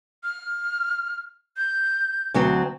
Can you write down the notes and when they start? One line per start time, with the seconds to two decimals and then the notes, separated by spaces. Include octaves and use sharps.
0.24 F6
1.57 G6
2.34 D2 F#3 C4